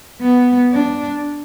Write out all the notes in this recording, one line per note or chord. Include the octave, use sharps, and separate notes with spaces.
B3
D4